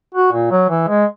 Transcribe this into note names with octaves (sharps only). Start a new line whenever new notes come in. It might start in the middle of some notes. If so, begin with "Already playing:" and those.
F#4
A#2
F#3
E3
G#3